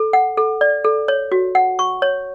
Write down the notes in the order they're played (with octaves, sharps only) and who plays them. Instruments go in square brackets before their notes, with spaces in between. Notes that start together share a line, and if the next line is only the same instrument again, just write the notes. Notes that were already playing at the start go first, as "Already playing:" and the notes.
Already playing: [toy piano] A4
F#5
A4
D5
A4
C#5
F#4
F#5
C#6
C#5